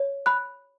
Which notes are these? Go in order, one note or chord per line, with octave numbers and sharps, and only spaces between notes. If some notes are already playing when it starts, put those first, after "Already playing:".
Already playing: C#5
B5 F#6